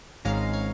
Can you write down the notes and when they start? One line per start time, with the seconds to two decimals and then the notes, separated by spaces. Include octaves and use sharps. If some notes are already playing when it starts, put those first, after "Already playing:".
0.25 G#1 G#2 G#3 C#4 F5 A#5
0.53 C#5 F5